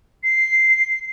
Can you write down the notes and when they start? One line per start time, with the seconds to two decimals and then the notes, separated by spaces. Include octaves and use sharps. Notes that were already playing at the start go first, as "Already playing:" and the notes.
0.23 C7